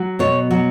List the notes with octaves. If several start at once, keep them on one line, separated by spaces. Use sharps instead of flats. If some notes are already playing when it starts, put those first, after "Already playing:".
Already playing: F#3
B2 C#5
F#3